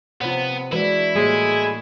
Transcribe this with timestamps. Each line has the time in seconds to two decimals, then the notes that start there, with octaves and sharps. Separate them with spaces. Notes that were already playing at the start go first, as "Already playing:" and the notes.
0.21 C3 B3 F4 C#5
0.72 E3 G#3 D4 E4 F#4 B4
1.15 A2 G3 G#3 A#3 G#4 C#5